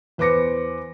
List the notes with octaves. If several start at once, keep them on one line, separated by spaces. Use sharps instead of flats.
E2 B4 C5 D6 A#6 C#7